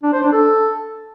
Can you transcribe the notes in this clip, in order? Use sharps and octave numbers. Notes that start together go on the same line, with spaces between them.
D4
C5
D4
A4